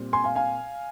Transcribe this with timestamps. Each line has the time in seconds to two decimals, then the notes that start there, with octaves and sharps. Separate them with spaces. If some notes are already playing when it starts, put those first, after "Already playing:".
Already playing: A#2 G3 C4
0.13 G#5 C6
0.24 F5 G#5
0.35 F5 G#5